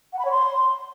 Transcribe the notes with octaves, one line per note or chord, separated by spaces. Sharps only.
F#5
B5
C#5
C6